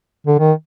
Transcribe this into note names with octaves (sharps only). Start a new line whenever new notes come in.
D3
D#3